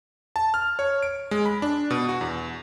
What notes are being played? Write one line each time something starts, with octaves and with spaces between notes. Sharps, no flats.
A5
F6
C#5
D7
G#3
B5
D4
B2
F#4
E2